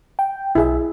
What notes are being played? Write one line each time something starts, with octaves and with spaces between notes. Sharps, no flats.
G5
B1 E4 G#4 E5